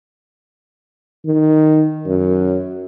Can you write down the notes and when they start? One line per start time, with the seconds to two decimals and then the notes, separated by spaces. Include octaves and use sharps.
1.25 D#3
2.06 F#2